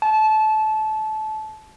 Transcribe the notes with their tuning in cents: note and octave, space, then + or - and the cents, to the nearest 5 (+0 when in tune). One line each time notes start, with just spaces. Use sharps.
A5 -25